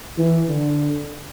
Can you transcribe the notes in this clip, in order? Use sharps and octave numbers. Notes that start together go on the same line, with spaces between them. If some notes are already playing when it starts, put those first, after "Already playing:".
E3
D3